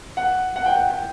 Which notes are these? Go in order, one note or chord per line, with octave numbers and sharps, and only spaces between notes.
F#5
F#5
G5
F#5
G5